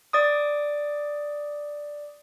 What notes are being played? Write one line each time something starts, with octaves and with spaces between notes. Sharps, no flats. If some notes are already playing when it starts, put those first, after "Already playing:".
D5 D6 D#6